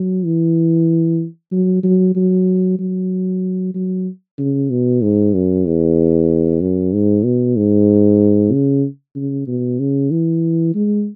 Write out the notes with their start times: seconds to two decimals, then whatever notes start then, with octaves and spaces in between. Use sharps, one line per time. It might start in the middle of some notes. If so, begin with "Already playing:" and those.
Already playing: F#3
0.25 E3
1.52 F#3
1.84 F#3
2.16 F#3
2.79 F#3
3.75 F#3
4.38 C#3
4.70 B2
5.02 G#2
5.34 F#2
5.66 E2
6.61 F#2
6.93 G#2
7.24 B2
7.57 G#2
8.52 C#3
9.16 C#3
9.47 B2
9.79 C#3
10.11 E3
10.75 G#3